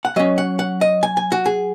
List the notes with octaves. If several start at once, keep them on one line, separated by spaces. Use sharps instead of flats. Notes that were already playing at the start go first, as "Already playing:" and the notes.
F#5
F#3 C#4 D#5
F#5
F#5
D#5
G#5
G#5
F#4
G#4